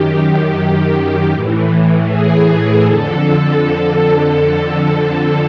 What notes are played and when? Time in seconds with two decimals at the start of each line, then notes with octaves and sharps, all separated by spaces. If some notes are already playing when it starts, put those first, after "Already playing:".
Already playing: F#2 D#3 G4
1.30 A2 E3
2.08 G#4
2.85 F2 D3 A4